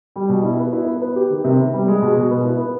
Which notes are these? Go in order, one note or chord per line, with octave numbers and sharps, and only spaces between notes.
G3
B2
E4
B3
E4
B3
B4
G4
D#3
C3
B3
G3
G#3
B2
B2
B3
E4
B3